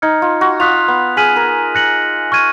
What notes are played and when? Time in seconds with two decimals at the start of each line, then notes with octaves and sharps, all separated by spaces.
0.02 D#4 F6 G#6 C#7
0.22 F4
0.41 F#4
0.60 F4 D#6 F#6 B6 F7
0.88 B3
1.17 G#4 F6 B6 D#7 F#7
1.36 A#4
1.75 F#6 A#6 C#7 F#7
2.32 C#6 F6 G#6 D#7